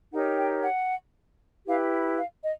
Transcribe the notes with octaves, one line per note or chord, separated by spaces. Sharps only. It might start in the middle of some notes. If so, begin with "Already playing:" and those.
D#4 G4 A#4 C#5 F#5
G5
F#5
E4 G4 B4 F5
F5
D#5